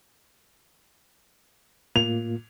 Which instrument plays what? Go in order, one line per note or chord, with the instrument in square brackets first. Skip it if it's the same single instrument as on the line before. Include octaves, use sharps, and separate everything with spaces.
[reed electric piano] A2 A#3 F4 [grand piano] F7